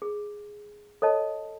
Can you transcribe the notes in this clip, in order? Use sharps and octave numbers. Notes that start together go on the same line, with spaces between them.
G#4
A4 C#5 D#5 A5